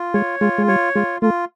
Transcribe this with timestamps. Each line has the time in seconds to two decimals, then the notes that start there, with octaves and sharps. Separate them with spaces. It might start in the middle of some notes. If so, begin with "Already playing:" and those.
Already playing: F4
0.14 G#3 C#5
0.41 G#3 F4
0.58 G#3
0.68 G3 C#5
0.95 G#3 F4
1.22 A3 F4